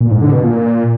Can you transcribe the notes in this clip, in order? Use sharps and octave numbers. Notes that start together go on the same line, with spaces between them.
A#2
G#2
D3
B2
A#2